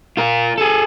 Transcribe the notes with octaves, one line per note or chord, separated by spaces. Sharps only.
F4 A#4
G#4 A4